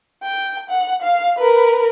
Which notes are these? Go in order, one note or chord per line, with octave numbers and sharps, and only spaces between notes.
G5
F#5
F5
A#4 B4